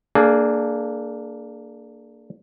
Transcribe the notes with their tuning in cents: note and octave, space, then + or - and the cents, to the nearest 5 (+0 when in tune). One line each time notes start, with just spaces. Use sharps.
A#3 -15 D4 +0 G#4 +25